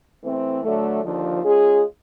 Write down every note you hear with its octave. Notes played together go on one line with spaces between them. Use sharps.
E3 A3 C4
D3 F#3 A3
D#2 D3 F3
G#3 C#4 F4 G#4